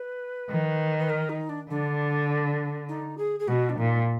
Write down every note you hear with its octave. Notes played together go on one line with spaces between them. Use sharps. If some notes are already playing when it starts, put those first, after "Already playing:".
Already playing: B4
D#3
B4
A#4
D#4
D4
D3 D4
D#4
G#4
G#4
B2 F#4
D4
A#2 D#4